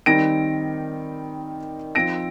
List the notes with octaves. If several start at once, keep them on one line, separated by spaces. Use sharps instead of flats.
D#3 G3 C4 D#4 A#6 D7
F3 C4 D#4 A#6 D7